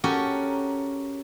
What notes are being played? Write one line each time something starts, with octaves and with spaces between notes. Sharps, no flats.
C#4 F#4 G4 A4 A#4